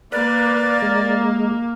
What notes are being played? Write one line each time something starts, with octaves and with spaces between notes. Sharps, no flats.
A#3 B4 D5
G#3